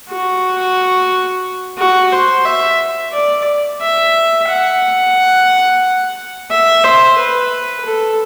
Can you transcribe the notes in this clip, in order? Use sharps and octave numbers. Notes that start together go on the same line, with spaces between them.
F#4
F#4
C5
E5
D5
E5
F#5
E5
C5
B4
A4